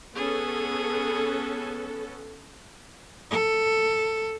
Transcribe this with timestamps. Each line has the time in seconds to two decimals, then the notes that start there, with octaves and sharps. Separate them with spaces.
0.15 B3 C#4 G#4 A4
3.31 A4